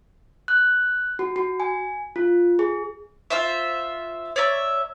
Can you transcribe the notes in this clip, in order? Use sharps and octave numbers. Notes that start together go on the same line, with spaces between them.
F#6
F#4
F#4
G#5
F4
G#4
F4 C5 E5
C#5 D5 E5 A#5